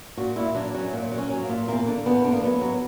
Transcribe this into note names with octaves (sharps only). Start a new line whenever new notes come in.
A#2 F#4
A#2 E4
F#3 D4
F#3 C#4
A#2
F#3
C#4
F#3
A#3
A#2
E2 A#3
D3
E2 B3
D3
A#3
F#3 B3
F#3